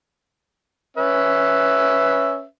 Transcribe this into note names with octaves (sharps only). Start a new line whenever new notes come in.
C#4 B4 E5